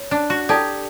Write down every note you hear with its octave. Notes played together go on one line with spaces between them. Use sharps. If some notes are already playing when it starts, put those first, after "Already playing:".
Already playing: C#5
D4
F#4
E4 G4 A4 D5 A5